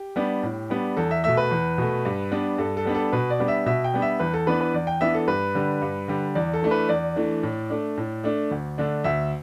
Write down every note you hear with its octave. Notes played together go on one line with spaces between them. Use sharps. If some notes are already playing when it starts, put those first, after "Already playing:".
Already playing: G4
G3 B3 D4
A2
G3 B3 D4
E2 A4
E5
B2 A3 E5
B4
E2
B2 A3
G2
G3 B3 D4
G2 A4
A4
G3 B3 D4
A4
B2 B4
D5
G3 B3 D4
E5
B2 E5
G5
G3 B3 D4
E5
E2 B4
A4
E3 B3 D4 B4
B4
E2 D5
G5
E3 B3 D4 E5
A4
G2 B4
D3 G3
G2
D3 G3
E2 D5
A4
E3 A3 D4
B4
E2 D5
E3 A3 D4
A2
A3 D4
A2
A3 D4
D2
D3 A3 D4
D2 E5